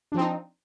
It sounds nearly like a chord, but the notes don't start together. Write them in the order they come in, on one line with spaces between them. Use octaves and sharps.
D4 F3 C4 D#4